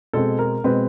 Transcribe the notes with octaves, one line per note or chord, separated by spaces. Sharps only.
B2 G#3 C4 A4
A#4
B2 G#3 C4 B4